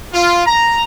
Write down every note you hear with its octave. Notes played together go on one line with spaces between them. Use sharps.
F4
A#5